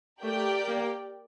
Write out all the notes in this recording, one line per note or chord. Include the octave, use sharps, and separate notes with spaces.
A3 G4 A#4 D5 G5
A#3